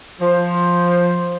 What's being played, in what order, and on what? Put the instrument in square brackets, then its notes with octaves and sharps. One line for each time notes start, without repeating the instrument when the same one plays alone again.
[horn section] F3 C5